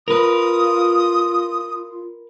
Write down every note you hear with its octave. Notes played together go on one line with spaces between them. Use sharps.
F4 A#4 B4 D#6